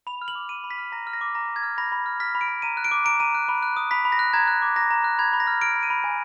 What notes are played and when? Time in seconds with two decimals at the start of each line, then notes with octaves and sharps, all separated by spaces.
0.07 B5 F7
0.22 F6
0.28 F#7
0.35 D6
0.49 B5 D#7
0.64 B5
0.71 B6
0.78 F6
0.92 A#5 A#6
1.07 F6
1.13 A#6
1.21 D6
1.35 A#5 A#6
1.49 A#5
1.56 G#6
1.63 F6
1.78 B5 A#6
1.92 B5
2.06 F6
2.20 F6 B6
2.35 B5
2.41 D7
2.48 B5
2.62 A#5 D#7
2.77 F#6
2.84 D7
2.91 D6
3.05 A#5 D7
3.20 A#5 D#7
3.35 F#6
3.49 B5
3.63 F#6
3.77 D#6
3.91 B5 B6
4.05 B5
4.12 A#6
4.19 F#6
4.33 A#5 G#6
4.48 F#6
4.62 D6
4.76 A#5 A#6
4.90 A#5
5.04 F#6
5.19 B5 G#6
5.33 B5
5.40 A#6
5.47 F6
5.61 F6 D7
5.75 B5
5.83 D#7
5.90 B5
6.04 G#5